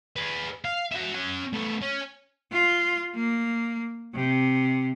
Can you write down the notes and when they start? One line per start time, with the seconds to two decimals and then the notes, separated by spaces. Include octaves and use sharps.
0.16 G#4 B4
0.65 F5
0.92 F#4 E5
1.15 C#4 F#5
1.53 A3 B3
1.82 C#4
2.52 F4
3.15 A#3
4.14 C3